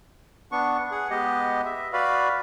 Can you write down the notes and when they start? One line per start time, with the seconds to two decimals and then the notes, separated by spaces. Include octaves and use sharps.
0.52 B3 D4 C#6
0.91 G#4 F#5
1.10 G#3 B3 G4 D#5
1.65 E5
1.93 F#4 B4 D5 F5 B5